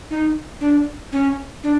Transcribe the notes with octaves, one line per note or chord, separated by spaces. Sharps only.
D#4
D4
C#4
D4